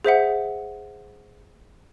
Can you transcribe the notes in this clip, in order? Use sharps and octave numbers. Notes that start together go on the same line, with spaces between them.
G#4 C5 E5 F#5